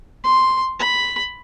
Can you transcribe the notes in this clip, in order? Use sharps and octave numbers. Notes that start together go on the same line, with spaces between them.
C6
B5